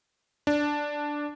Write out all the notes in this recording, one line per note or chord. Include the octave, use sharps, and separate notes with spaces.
D4